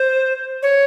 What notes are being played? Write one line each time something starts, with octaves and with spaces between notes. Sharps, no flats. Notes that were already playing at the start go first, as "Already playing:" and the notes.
Already playing: C5
C#5